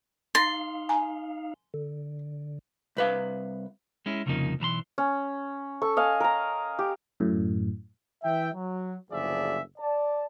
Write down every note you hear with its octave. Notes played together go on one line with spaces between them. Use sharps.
D#4 F5 C6 A6 A#6
G#5 A#5
D3
C2 B4 F5
G#3 C#4 E4
C2 F2 C#3 F3 A#3 D#4
B1 E3 A#5 C6
C#4
A4 C#6
D#5 F5 G#5
A#4 A#5
G4
F#2 A2
E3 E5 G5
F#3
F#1 D2 F3 G#4 D5 E5
D5 A5